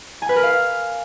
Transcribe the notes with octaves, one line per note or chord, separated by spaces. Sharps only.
G#5
B4
A#4
F5